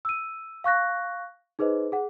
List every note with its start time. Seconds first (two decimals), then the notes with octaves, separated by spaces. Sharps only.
0.05 E6 D#7
0.64 F5 C#6 F#6 A#6
1.59 D#4 G#4 B4 C5 D#5
1.92 G#4 F#5